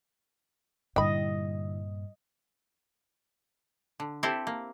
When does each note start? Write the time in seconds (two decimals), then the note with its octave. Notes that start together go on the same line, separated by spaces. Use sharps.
0.96 G2 A#2 D3 G3 E4 D#5 G5 B5
4.00 D3
4.23 C4 E4 G4 A4 C5 E5
4.47 A#3